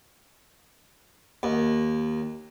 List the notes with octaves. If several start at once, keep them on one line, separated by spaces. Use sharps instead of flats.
D#2